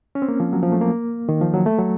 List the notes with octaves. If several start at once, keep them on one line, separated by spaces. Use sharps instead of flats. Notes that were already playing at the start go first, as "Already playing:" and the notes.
C#4
C4
A#3
F3
F#3
F3
A3
A#3
D#3
F3
F#3
A3
F#3